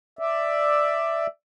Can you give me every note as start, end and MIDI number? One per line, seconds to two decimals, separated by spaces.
0.19 1.27 74
0.19 1.27 76